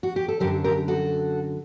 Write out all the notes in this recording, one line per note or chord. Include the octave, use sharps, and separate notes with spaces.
F#4
G4
A4
F#2 D3 F#3 G4 A#4
G4 A#4
F#4 A4